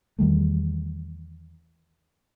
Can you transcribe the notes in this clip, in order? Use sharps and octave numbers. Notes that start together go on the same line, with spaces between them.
E2 D#3 G3 A3